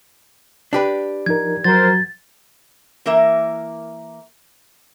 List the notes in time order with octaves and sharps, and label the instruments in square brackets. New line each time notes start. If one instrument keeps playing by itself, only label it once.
[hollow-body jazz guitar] D4 G4 B4
[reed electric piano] F3 D#4 A#4 [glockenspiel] G#6
[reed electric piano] F3 F#3 F#4 [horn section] A#4 C5 [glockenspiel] A6
[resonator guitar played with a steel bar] E3 A#3 A#4 E5